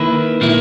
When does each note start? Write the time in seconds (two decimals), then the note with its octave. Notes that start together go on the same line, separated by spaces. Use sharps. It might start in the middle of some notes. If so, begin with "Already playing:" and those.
Already playing: D#3 A#3 E4 B4
0.41 A#2 A#3 E4